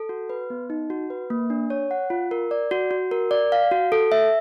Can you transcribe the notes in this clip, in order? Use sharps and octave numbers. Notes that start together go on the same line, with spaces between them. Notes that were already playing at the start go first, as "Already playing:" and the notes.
Already playing: A4
F#4
B4
B3
D#4
F#4
B4
A#3
D4
C#5
F#5
F4
A#4
D5
F#4
F#4
A#4
D5
F5
F#4
A4
E5